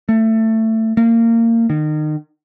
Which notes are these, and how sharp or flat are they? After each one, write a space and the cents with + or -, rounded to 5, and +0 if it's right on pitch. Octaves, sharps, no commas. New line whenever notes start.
A3 +20
A#3 -25
D#3 -30